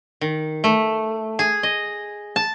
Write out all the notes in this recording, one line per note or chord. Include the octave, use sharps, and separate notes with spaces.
D#3
A3
G#4
D#5
A5